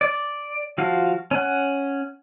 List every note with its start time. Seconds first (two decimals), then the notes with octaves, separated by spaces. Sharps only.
0.01 D5
0.78 F3 F#4 F5
1.31 C#4 F#5